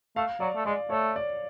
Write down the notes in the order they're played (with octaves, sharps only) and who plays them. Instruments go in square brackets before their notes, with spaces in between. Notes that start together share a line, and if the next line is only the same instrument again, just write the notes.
[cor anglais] A3 [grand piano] F5
[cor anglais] F#3 [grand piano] D5
[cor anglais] A3
[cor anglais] G#3 [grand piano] D5
[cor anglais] A3 [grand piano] C#5
[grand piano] D5